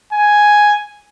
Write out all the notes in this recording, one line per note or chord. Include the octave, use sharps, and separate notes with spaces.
G#5